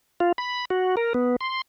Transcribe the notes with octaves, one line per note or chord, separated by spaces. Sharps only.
F4
B5
F#4
A#4
B3
C6